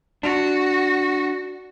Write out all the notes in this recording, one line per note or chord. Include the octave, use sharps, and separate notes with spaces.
D4 F#4